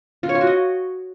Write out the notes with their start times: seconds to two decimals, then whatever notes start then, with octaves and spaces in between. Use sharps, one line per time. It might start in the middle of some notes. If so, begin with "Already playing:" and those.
0.23 F4
0.29 C#5
0.35 F4
0.41 F#4
0.47 D#5